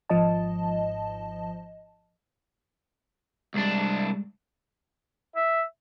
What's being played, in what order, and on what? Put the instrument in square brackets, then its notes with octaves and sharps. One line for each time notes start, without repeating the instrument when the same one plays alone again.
[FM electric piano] G#1 G#2 F3 D#5 A5
[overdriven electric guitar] C2 D4 [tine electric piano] G3 G#3
[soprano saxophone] E5